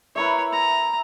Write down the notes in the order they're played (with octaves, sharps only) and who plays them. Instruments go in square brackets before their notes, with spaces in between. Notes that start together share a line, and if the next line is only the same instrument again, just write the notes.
[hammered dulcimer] E4 A#4 E5 [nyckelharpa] B4 C#5
[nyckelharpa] A#5